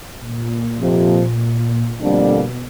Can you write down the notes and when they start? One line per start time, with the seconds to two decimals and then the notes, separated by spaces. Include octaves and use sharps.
0.19 A#2
0.81 F2 C3 F3
2.01 F2 B2 D3 G3 A#3 D4